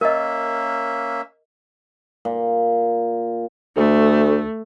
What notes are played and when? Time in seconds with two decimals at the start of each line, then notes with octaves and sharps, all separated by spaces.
0.01 A#3 C#4 A#4 D#5 E5
2.25 A#2
3.77 D2 A3